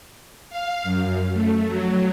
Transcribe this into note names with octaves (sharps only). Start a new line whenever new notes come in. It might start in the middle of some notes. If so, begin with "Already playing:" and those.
F5
F#2
A3
F#3